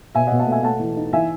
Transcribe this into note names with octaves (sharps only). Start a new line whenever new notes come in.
B2 E5 G#5
B2 D#5 F#5
F#5 A5
A3 E5 G#5
A3 F#5 A5
E3
D#4
E3 E5 G#5